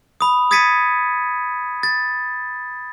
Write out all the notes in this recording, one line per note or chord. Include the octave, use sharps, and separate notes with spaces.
B5 D#6
D#6 G#6 A6 B6 C#7 D#7
A6